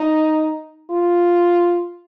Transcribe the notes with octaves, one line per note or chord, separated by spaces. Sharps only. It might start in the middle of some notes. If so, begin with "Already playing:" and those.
Already playing: D#4
F4